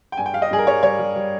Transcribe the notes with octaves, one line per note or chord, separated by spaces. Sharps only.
G5
G2 G#5
G5
G3 F5
D#5
G2 G#4
A#4
G3 C#5
G3 C#5
G3
G3